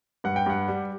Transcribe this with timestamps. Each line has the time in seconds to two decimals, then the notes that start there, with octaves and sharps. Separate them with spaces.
0.24 G2 F#5
0.36 G5
0.46 G2 F#5
0.68 G3